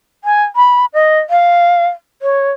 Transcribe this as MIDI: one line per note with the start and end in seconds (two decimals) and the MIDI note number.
0.24 0.44 80
0.56 0.86 83
0.94 1.19 75
1.30 1.87 77
2.22 2.51 73